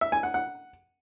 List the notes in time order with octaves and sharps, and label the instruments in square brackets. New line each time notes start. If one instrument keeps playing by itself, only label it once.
[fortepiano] E5
G#5
F#5
F#5